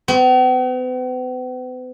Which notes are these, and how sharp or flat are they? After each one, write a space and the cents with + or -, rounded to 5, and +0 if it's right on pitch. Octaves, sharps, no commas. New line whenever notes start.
B3 +45